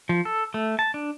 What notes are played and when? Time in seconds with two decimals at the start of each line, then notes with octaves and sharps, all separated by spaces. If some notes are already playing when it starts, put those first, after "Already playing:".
0.09 F3
0.25 A4
0.54 A3
0.79 A5
0.94 D4